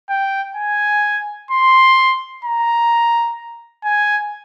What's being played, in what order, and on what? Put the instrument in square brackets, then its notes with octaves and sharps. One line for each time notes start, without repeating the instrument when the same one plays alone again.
[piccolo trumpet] G5
G#5
C6
A#5
G#5